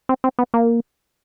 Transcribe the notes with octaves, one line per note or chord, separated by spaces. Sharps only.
C4
C4
B3
A#3